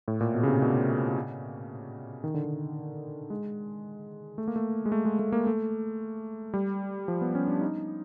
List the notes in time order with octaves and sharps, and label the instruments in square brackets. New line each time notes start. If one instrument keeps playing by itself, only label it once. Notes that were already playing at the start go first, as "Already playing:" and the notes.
[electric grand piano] A2
A#2
B2
C#3
C3
B2
D#3
D3
D#3
G#3
A3
A#3
A3
G#3
A3
G#3
A3
A#3
A3
G3
F3
B3
C#4
D4
D#4